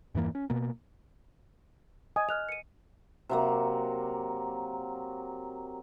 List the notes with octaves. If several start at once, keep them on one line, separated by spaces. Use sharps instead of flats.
E2 G2 E3 A#3
C#4
B2 A#3
D#5 G#5 D#6
D#5 F6 F#6 F7
C#7 D#7
C3 F#3 A#3